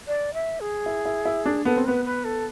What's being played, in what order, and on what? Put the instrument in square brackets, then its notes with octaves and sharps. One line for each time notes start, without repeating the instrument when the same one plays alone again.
[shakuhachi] D5
E5
G#4
[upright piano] E4
E4
E4
D4
[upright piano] B3 [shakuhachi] A4
[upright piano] C4
[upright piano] B3 [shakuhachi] B4
[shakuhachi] B4
A4